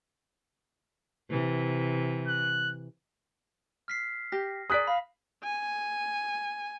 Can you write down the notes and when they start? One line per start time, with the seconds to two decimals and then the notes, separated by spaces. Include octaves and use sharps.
1.30 C3 E3
2.28 F#6
3.88 F6 B6 C7
4.32 G4 A#6
4.70 G#4 A#4 D5 D#6 F#6 B6
4.87 F5 B5
5.44 G#5